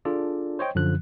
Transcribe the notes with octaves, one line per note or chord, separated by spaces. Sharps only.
D4 F4 G#4 A4 D5
C5 C#5 D#5 G5
F#2 D3 F3 F#6